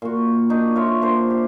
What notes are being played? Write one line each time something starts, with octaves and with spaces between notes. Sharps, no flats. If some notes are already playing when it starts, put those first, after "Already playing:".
A#2 F#4
D4 D#4 F#4
F4 C#5 E5
A#3 D4 C5
G4